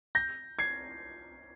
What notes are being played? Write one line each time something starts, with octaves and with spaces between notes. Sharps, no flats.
G6 A#6
G#6 C7